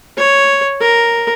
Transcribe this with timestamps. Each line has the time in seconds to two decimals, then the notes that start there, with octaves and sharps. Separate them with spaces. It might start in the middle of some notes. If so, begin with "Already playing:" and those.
0.18 C#5
0.81 A#4